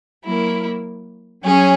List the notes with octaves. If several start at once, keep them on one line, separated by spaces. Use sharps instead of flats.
F#3 A#3 E4 A#4
F#3 C#4 G#4 C#5